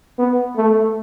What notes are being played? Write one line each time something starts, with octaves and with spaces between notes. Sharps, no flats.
B3
A3